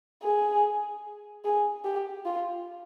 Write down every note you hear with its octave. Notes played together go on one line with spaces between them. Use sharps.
G#4
G#4
G4
F4